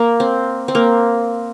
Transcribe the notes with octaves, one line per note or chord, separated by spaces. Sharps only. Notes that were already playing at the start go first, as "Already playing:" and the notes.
Already playing: A#3
C4
C4
A#3